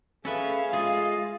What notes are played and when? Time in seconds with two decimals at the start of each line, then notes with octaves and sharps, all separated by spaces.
0.25 C#4 G#4 A4 B4 E5 F5
0.73 G#3 F4 G#4 D#6